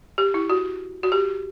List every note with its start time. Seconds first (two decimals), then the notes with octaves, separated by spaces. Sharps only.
0.18 G4
0.34 E4
0.50 F#4
1.03 F#4
1.12 G4